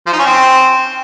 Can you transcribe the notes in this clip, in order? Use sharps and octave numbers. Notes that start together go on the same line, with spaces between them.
F3
D#4
C#4
C4